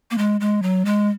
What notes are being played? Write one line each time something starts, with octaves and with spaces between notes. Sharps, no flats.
A#3
G#3
G#3
F#3
G#3